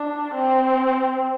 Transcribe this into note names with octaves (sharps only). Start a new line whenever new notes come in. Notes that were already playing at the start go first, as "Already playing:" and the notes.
Already playing: D4
C4